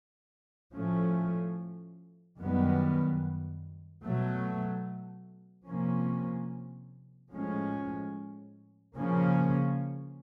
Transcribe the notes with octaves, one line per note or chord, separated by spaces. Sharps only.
A2 F3 A3 C#4
F#2 D#3 G3 B3
B2 F#3 A3
C3 F3 A#3 C#4
A2 F3 G#3 C#4
C#3 F3 A#3 C#4